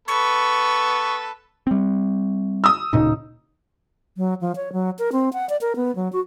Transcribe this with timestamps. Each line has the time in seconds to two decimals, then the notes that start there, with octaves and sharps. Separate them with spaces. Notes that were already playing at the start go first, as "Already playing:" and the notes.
0.08 B3 A4 B4 C#6
1.67 G3 C4
2.64 D#6 E6
2.93 D1 A#2 C#3 D#4
4.17 F#3
4.41 F3
4.56 C#5
4.73 F#3
4.99 A#4
5.12 C4
5.33 F#5
5.49 D5
5.61 A#4
5.76 B3
5.96 F#3
6.13 F#4